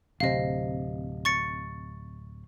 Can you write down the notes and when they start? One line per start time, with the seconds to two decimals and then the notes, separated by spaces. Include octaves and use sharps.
0.20 D1 C3 C4 D#5 F5
1.25 C#6 A6 C#7